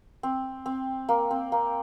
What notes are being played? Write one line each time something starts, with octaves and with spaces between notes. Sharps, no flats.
C4
C4
A#3
C4
A#3